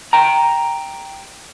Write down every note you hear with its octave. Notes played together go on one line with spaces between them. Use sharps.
G5 A#5